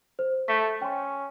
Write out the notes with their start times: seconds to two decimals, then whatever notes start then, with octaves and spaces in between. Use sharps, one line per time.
0.19 C5
0.48 A3 B6
0.82 C#4 G5 C6